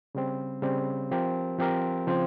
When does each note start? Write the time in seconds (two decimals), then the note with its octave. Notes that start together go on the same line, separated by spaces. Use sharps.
0.15 C#3 G3 C4
0.62 C#3 G3 C4
1.11 F3 C4 G4 A#4
1.59 F3 C4 G4 A#4
2.07 C#3 F3 C4 F4 C5